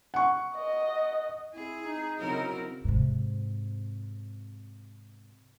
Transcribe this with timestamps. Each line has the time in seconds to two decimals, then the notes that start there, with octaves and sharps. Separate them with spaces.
0.14 F#5 C#6
0.55 D#5
1.53 C4 E4 G#4
1.84 D#4
2.19 C#3 F#3 C4 E4 A#4
2.84 G#2 C3